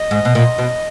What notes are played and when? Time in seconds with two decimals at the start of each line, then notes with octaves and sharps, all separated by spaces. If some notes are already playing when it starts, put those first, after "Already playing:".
Already playing: D#5
0.11 G#2
0.25 B2
0.35 A#2
0.58 B2